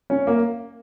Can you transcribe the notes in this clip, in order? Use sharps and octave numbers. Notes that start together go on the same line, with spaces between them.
C#4
A#3